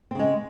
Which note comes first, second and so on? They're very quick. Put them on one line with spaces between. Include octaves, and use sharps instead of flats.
C4 C#3 G#3